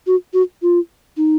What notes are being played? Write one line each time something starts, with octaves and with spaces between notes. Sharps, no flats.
F#4
F#4
F4
D#4